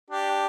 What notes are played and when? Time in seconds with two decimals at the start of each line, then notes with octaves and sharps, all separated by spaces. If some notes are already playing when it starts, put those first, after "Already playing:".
0.10 D4 G4